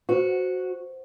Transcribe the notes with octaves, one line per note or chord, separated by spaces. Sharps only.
F#4 B4 C5